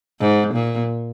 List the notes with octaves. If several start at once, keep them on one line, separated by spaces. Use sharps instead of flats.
G#2
A#2